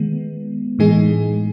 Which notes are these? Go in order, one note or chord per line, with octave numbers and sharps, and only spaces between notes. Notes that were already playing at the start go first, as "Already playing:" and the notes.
Already playing: D#3 G#3 B3
A2 E3 G#3 D#4 G#4